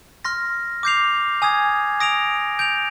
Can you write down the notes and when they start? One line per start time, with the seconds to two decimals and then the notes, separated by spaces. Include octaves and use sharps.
0.25 C6 F6 A#6
0.83 D6 G6 C7 F7
1.42 G#5 D#6 G#6
2.00 D#6 A#6 D7 F7
2.59 G6 D7 F7